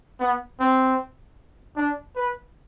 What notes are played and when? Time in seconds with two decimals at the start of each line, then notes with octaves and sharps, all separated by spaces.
0.20 B3
0.60 C4
1.76 D4
2.16 B4